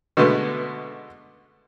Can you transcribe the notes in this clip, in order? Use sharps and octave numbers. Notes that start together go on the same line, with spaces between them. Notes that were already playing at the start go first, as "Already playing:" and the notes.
B2 D3 G#3 A3 B3